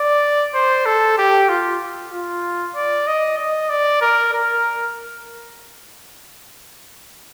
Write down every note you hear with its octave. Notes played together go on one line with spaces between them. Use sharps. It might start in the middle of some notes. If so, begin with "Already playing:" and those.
Already playing: D5
C5
A4
G4
F4
F4
D5
D#5
D#5
D5
A#4
A#4